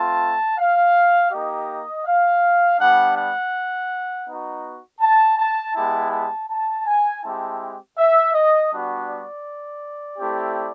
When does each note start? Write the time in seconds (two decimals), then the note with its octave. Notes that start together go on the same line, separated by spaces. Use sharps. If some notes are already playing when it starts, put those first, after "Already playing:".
Already playing: A3 C4 F4 A5
0.58 F5
1.31 A#3 D#4 G4 D#5
2.06 F5
2.80 G3 B3 D4 F#5
3.16 F#5
4.27 B3 D#4 F#4
5.01 A5
5.38 A5
5.75 G#3 B3 E4 G4 A5
6.12 A5
6.50 A5
6.86 G#5
7.23 G#3 C4 E4 G4 A5
7.97 E5
8.34 D#5
8.71 G3 B3 D4 F#4
9.09 D5
10.18 A3 C4 E4 G4